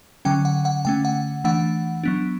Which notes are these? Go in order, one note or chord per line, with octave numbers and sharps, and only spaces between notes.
D3 F#3 C#4 G5
F#5
F#5
D3 A3 C#4 G5
F#5
E3 A3 D4 F#5
F#3 B3 D4